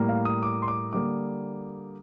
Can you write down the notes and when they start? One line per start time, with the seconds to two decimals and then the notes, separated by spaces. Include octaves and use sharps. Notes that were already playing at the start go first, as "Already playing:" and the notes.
Already playing: A2 G3 A#3
0.09 F5
0.25 D#6
0.43 D6
0.62 C6
0.68 D6
0.93 D3 G3 A#3 D6